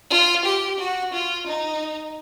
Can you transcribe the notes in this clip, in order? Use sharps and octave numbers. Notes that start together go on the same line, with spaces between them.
F4
G4
F#4
F4
D#4